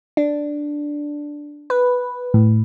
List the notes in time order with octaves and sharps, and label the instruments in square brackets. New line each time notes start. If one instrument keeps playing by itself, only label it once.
[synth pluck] D4
B4
A2